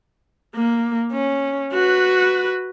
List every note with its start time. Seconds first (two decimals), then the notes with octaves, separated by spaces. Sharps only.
0.56 A#3
1.13 C#4
1.74 F#4 B4